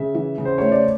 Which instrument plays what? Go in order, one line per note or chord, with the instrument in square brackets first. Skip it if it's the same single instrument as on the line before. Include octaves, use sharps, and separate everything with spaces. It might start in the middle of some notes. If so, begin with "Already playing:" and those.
Already playing: [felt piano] C#3 [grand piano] E5
[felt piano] E3
C#3
[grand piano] C5
[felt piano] A3 [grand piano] C#5
[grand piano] D5